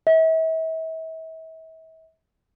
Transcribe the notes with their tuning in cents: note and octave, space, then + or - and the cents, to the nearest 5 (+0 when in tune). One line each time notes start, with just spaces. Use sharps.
E5 -40